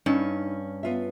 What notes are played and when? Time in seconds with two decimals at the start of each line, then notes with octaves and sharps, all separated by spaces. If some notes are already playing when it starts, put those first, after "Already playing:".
0.06 G2 C#4 D#4
0.83 B3 F4 E5